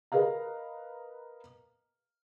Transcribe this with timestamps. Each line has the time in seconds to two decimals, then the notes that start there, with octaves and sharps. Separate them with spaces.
0.12 A#4 B4 D#5 F5 A#5